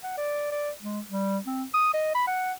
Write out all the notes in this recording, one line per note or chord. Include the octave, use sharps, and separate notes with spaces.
F#5
D5
D5
G#3
G3
C4
D#6
D#5
B5
F#5